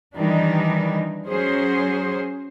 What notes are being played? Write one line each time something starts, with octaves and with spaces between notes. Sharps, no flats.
D#3 E3 G3 D4 D#4
F#3 C#4 G#4 C5